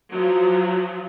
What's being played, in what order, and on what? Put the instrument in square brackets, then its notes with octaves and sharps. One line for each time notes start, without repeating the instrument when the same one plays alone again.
[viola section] F3 F#3